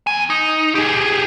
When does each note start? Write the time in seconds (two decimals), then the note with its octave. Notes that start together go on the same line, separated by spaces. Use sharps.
0.07 E2 G#5
0.30 D#4
0.75 G4 G#4